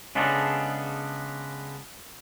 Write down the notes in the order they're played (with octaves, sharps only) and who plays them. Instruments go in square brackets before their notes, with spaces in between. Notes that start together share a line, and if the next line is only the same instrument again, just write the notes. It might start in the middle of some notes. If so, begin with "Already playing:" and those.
[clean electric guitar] C#3 G#3 B3 C#4 D4 A4